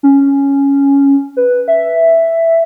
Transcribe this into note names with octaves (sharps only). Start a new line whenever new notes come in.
C#4
B4
E5